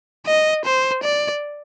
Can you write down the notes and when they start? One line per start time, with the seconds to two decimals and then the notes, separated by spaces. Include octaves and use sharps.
0.27 D#5
0.65 C5
1.03 D5